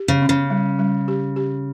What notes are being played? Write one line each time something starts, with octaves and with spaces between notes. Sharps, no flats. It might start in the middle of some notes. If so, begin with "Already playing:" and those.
Already playing: G4
C#3
C#4
C#3
G3
G3
G4
G4